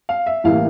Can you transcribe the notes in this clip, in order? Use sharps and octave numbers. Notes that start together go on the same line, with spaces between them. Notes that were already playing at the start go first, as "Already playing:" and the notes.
F5
E5
A1 A2 E3 G3 A#3 F5